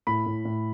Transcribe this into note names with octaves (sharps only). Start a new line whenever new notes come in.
A2 B5
A2
A2